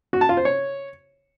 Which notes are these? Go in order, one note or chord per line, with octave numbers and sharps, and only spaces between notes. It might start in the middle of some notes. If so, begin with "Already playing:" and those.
F#4
A5
F4
C5
C#5